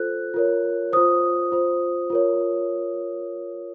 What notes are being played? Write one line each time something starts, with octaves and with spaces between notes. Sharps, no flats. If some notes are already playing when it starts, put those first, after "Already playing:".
Already playing: F4 A4 C5 F#6
F4 A#4 C#5
F4 C5 D#6
F4 C5
F4 A#4 C#5